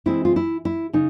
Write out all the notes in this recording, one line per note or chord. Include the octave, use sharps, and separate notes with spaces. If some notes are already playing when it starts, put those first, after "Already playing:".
E3 G#3 C4 E4
F4
E4
E4
C#3 D#4